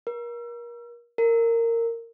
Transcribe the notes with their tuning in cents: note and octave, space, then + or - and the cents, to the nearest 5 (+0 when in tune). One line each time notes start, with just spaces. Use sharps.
A#4 +30
A#4 -15